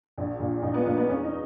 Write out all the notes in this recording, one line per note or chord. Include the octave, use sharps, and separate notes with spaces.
A#1
A#2
A#1 D#4
B3
A#2 A#3
B3
E2 C#4
D#4